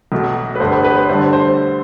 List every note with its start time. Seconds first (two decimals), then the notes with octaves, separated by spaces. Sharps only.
0.12 B1 B2 A3
0.55 B4
0.60 G1 G2 D3 A3 C5
0.72 B4
0.84 B4
0.97 C5
1.08 G2 D3 A3 D4 C5
1.33 C5